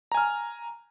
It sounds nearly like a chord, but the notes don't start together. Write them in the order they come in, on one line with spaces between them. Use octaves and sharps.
A#5 G#5 F6